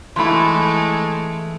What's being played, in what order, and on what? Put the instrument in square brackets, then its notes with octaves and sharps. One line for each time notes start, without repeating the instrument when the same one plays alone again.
[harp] E3 E4 [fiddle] G#3 A3 [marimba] B5 C6